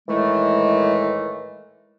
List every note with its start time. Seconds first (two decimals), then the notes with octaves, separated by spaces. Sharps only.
0.08 A2 D#3 E3 G#3 A3